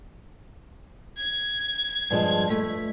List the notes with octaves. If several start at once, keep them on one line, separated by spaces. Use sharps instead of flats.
G#6
G2 F3 G#3
A3 B6